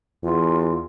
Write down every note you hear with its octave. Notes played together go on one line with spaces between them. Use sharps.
E2 F4